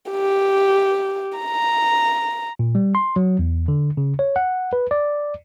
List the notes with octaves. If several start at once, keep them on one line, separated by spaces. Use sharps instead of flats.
G4
A#5
A#2
G3
C6
F#3
E2
D3
C#3
C#5
F#5
B4
D5